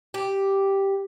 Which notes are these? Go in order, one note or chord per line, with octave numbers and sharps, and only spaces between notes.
G4